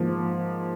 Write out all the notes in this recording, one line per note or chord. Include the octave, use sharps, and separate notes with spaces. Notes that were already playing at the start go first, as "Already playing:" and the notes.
Already playing: G#2 F3 A#3